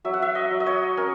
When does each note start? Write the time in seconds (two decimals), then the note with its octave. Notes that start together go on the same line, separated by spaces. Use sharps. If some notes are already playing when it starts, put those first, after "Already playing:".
0.05 F#3 E5
0.13 F#5
0.22 E5
0.35 D#5
0.51 F#3
0.60 D#5
0.66 C#5
0.97 C#4 A#4